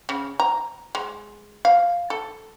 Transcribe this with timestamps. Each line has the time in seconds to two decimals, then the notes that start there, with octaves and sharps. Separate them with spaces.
0.09 C#3
0.40 A#5
0.95 G#3
1.65 F5
2.10 A4